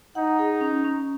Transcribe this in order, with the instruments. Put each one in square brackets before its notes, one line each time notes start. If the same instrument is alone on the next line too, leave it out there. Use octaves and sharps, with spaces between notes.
[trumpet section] D#4 [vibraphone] F#5
[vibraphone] G#4
C#4
C#4